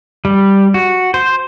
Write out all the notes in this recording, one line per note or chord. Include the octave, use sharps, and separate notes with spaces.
G3
F#4
C5